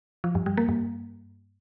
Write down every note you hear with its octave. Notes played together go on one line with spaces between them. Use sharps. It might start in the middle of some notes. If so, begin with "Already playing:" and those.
F3
G2
G3
A#3
G2